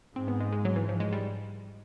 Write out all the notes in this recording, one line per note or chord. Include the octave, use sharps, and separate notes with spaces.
G#2 C4
B3
G#3
G#3
F#3
E3
F3
G#3
G3